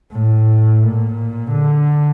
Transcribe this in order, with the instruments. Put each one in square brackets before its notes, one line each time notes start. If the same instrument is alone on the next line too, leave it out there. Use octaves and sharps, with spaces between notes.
[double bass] A2
A#2
D3